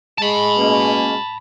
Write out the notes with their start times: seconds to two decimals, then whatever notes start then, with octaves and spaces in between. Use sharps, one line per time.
0.18 G#3 A5 B5
0.57 B2 A#3 C#4